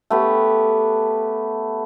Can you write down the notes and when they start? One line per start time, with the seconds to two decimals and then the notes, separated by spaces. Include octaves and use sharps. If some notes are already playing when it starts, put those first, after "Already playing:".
0.10 A3 B3 G4